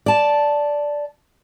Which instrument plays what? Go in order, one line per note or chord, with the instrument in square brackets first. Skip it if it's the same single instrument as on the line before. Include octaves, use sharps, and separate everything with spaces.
[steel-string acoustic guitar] D5 A5